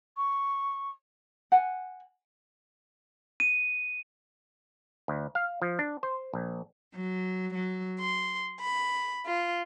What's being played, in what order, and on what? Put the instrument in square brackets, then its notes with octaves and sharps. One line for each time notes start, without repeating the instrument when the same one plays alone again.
[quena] C#6
[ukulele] F#5 G#5
[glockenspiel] D#7
[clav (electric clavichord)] D2
F5
F3
D4
C5
A#1
[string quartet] F#3
F#3
C6
B5
F4